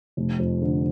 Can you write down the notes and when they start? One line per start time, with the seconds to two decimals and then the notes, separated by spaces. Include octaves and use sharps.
0.17 F1
0.39 F2
0.62 D3